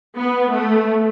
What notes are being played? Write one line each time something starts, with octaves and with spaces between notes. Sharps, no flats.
B3
A3